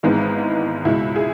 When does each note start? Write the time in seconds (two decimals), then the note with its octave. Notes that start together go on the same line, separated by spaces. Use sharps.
0.03 G#1 G#2 E3 G#3 B3 D#4
0.85 C#2 B2 G#3 E4
1.16 G#4